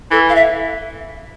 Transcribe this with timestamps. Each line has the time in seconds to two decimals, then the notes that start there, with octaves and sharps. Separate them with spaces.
0.11 E3 A4
0.29 F5
0.35 E5